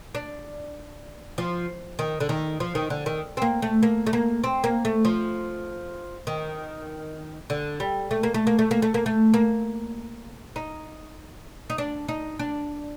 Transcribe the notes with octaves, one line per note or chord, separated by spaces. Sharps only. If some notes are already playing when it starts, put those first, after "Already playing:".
D4
F3
D#3
D3
D#3
F3
D#3
D3
D#3
C4
A#3
A3
A#3
A3
A#3
C4
A#3
A3
F3
D#3
D3
G3
A3
A#3
A3
A#3
A3
A#3
A3
A#3
A3
A#3
D#4
D#4
D4
D#4
D4